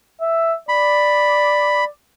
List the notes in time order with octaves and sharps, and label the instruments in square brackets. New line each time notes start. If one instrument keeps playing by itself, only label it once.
[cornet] E5
[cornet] D5 [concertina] B5